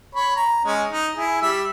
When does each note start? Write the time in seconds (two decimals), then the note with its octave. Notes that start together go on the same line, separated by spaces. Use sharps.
0.15 C#5 B5
0.36 A#5
0.65 G#3 C#4
0.90 D#4
1.15 E4 G#4
1.42 G3 E5